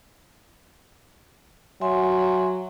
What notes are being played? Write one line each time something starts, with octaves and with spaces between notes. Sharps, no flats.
F#3 E5 G#5 C6